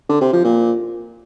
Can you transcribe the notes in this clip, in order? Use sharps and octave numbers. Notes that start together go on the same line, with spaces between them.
D3
C3
F3
A#2